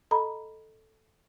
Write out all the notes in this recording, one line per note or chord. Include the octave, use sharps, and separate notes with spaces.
A4 D#5 A#5 B5